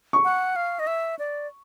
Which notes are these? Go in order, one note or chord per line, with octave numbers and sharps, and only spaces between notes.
C#6
F#5
F5
D#5
E5
D5